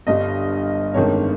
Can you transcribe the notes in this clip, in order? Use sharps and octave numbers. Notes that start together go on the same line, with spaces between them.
G1 G2 G3 D#5
G1 F2 D#3 G#3 C#5